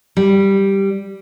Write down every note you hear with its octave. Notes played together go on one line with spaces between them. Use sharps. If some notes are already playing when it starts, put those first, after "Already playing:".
G3